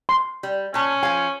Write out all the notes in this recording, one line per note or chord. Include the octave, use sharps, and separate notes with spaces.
C6
G3
A#2 C#4 A5
F3 F5 G#5